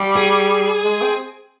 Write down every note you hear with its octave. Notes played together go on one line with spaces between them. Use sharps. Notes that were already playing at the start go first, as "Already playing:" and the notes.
Already playing: G3
G#4
G#3
C4